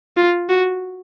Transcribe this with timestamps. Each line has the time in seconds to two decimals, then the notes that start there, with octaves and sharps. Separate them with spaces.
0.17 F4
0.49 F#4